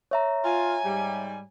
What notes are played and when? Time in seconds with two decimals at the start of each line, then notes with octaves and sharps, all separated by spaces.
0.11 C#5 E5 A#5
0.45 F4 G#5
0.85 G#2 G3